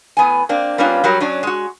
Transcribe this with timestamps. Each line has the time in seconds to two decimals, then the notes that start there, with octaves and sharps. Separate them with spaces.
0.17 A2 B3 G#5
0.49 A#3 C4 D4
0.78 G3 A#3 B3 C#4 D4 F4
1.04 F#3 G3 F#4 A#4
1.20 F#3 C#4 D4
1.43 G#3 F#4